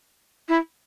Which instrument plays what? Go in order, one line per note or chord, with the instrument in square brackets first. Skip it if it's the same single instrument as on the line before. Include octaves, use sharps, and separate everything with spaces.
[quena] E4